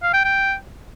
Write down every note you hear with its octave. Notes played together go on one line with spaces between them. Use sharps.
F5
G5
G5